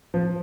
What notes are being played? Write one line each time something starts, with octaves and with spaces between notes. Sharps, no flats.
F3